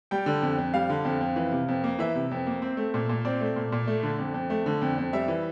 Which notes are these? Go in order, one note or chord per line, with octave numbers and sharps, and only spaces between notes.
G3 G5
D3
F2
F2
G3 F5
D3
F2
F2
E3
C3
F2
A#3
E3 E5
C3
F2
A#3
C4
A3
A#2
A#2
C4 D5
A3
A#2
A#2
A3
D3
F2
F2
A3
D3
F2
F2
G3 E5
E3